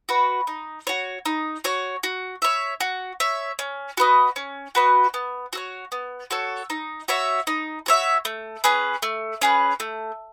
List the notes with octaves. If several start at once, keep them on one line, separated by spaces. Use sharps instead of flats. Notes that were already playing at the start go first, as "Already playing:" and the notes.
F#4 B4
D#4
F#4 C#5
D#4
F#4 C#5
F#4
C#5 E5
F#4
C#5 E5
C#4
F#4 B4 D#5
C#4
F#4 B4 D#5
B3
F#4 A4 C#5
B3
F#4 A4 C#5
D#4
F#4 C#5 E5
D#4
F#4 C#5 E5
A3
C#4 G#4 B4
A3
C#4 G#4 B4
A3